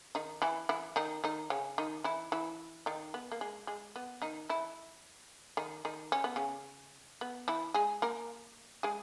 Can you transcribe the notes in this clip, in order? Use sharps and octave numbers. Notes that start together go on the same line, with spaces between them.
D#3 D#4
E3 E4
E3 E4
D#3 D#4
D#3 D#4
C#3 C#4
D#3 D#4
E3 E4
E3 E4
D#3 D#4
B3
A#3
G#3
G#3
B3
D#3 D#4
E3 E4
D#3 D#4
D#3 D#4
C#4
B3
C#3 C#4
B3
E3 E4
G#3 G#4
A#3 A#4
G#3 G#4